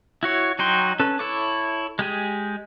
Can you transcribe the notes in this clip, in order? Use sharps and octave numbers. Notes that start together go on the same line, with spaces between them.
E4 F#4 C#5
F#3 D#4 F#4 G5 C6
C#4 A4 B4
E4 A4 C#5 E5 D6
G#3 G4 G#4